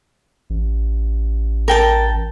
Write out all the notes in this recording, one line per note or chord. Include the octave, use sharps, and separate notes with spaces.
A1
A#4 G5 A5